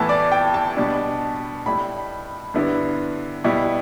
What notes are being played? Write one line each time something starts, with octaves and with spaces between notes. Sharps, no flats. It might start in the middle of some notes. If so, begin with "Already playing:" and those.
Already playing: A2 E3 B3 E4 A5
D5
G5
A5
B2 G3 D4
A2 G3 E4 B5
G2 D3 B3 E4
B2 G3 E4